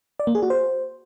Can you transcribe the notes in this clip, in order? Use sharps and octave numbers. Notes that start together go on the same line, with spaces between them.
D5
A#3
G#4
F#4
C5